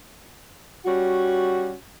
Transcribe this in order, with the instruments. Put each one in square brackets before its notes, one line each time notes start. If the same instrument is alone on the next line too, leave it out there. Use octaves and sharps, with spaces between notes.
[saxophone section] G3 C#4 F#4